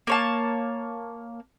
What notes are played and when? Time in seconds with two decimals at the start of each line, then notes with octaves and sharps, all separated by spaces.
0.07 A#3 C#5 A5